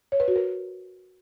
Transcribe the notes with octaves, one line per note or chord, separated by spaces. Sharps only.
C#5
B4
F#4
A#4